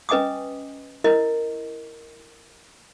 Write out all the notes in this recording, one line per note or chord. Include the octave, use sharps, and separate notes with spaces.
C#4 B4 D#5 G#5 D6 D#6
E4 A#4 D#5